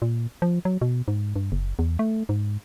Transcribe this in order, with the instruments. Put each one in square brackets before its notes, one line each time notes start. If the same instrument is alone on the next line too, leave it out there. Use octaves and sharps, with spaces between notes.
[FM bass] A#2
F3
F#3
B2
G#2
G2
F#1
E2
A3
G#2